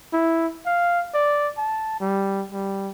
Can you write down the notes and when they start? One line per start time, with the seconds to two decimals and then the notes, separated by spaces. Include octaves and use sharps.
0.13 E4
0.66 F5
1.14 D5
1.58 A5
2.00 G3
2.52 G3